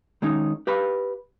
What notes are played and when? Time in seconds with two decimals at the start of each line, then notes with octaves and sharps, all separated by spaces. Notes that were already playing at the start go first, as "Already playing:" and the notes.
0.22 D#3 G#3 C#4 D#4
0.67 G4 B4 F5 B5